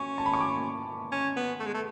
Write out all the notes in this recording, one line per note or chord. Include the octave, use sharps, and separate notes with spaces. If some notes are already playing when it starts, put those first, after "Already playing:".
Already playing: C#4 C#6
A5
B5
C#6
D6
C#4
B3
A3
G#3
A3